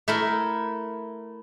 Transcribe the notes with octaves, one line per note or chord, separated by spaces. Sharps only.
A3 E4 A#4